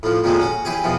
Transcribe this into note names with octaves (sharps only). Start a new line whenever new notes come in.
A2 F3
F2 A#2 D#3 F3 G#3 A3
C#4 F#4
E3 G4 G#4
E2 B2 E3 F3